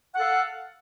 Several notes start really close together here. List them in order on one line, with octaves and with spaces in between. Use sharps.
F#5 A4 F5